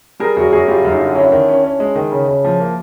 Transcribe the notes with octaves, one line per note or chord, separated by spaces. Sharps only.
G3 G#4 A#4
F#2 F#4 G#4
F#2 F#4 G#4
G3 F4 G4
F#2
D#4 F4
D3
C#4 D4 E4
D#3
C#4
C#4
G#3
D#3
C#3
C#3
F3
A#3